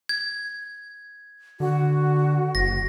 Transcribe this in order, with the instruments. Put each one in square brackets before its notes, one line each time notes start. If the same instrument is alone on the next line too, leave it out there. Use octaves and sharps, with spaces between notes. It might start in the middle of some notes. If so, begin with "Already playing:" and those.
[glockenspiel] G#6
[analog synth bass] D3 [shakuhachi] F#4
[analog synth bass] F#1 [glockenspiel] A#6